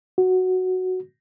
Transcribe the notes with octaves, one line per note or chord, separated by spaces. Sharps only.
F#4